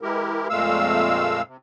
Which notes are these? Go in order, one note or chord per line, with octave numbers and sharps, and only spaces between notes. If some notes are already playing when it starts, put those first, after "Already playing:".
E3 G#3 E4 G4 A#4
F2 A#2 G#3 A3 F5 E6
C3